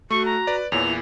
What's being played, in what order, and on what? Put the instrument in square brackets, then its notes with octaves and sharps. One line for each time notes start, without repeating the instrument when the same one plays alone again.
[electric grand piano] A3 [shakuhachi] F#4 [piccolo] C#6
[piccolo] A#5
[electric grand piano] B4 D5
[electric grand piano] E2 A#2 E3 [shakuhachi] C#5 [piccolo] F7
[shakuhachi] E4